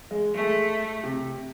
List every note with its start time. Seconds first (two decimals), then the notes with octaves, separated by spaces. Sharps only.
0.11 G#3
0.35 G#3 A3
1.03 C3